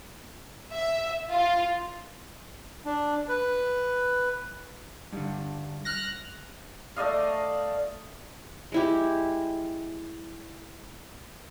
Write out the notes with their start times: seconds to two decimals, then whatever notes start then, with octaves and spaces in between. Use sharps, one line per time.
0.74 E5
1.32 F4
2.85 D4
3.28 B4
5.13 G2 D3
5.85 F6 F#6 A#6
6.96 A3 D5 D#5 F5
8.72 G#3 E4 G4